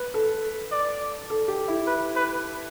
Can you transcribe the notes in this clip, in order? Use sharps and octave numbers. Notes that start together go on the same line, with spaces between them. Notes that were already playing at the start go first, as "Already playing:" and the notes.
Already playing: B4
A4
D5
A4
G4
E4
B4
B4